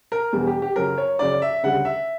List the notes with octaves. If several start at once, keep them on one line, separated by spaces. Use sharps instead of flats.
A#4
E1 E2 B2 G3
G4
G4
F#2 C#3 F#3 C#4 A#4
C#5
F#2 C#3 F#3 C#4 D5
E5
D2 C#3 G3 F#5
E5